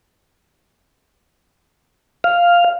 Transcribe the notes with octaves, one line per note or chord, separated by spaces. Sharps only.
F5